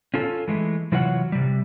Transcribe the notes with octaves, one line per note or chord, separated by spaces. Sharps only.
C#4 F4 A4
E3 G#3 A3
C3 E3 F#3 F4 C#5 F#5
C3 G3